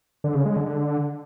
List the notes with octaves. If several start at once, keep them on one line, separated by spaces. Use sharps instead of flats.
D3
C#3
G#3
D3